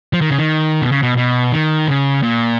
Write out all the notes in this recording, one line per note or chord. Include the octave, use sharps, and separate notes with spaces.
F3
D#3
C#3
D#3
B2
C#3
B2
B2
D#3
C#3
A#2